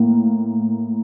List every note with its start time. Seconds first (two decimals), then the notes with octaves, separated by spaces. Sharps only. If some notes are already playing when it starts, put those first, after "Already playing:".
Already playing: A2 A#3